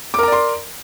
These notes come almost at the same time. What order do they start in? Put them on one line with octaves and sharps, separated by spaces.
D6 A#4 A#5 D5 C6